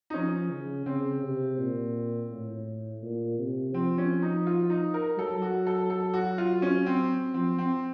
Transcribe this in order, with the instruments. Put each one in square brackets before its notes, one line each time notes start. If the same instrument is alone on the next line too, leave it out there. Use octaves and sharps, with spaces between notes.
[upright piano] D#4
[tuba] F3 [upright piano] C#4
[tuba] C#3
[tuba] C#3 [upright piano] C4
[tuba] C3
A#2
A2
A#2
C3
[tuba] F3 [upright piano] C4
[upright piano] C#4
D#4
F4
D#4
A#4
[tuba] F#3 [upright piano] A4
[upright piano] F#4
A4
A4
F#4
F4
C#4
C4
[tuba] F3 [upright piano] C4
[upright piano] C4